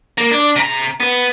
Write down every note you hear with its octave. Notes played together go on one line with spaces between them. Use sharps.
A#3
D4
C3 A#5
B3